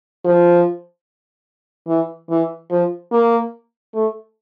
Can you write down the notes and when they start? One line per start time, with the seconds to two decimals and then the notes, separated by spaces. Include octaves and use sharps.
0.25 F3
1.88 E3
2.30 E3
2.71 F3
3.12 A#3
3.94 A3